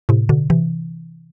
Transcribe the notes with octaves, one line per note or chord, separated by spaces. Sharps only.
A2 C3
B2 D3
C3 E3